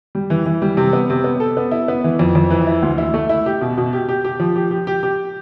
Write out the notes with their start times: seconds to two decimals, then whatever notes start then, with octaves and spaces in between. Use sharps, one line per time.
0.15 G3
0.30 E3
0.46 E3
0.62 G3
0.77 C3
0.93 B3
1.10 C3
1.24 B3
1.40 A4
1.57 B3
1.71 E4
1.88 B3
2.04 E3
2.19 F2
2.35 F2
2.50 E3
2.67 E4
2.82 D2
2.98 E4
3.14 A3
3.29 E4
3.46 G4
3.61 B2
3.78 B2
3.93 G4
4.09 G4
4.25 G4
4.39 F3
4.56 G4
4.71 G4
4.87 G4
5.03 G4